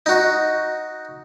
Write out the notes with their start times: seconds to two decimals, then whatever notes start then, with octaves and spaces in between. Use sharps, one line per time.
0.06 D#4 F#4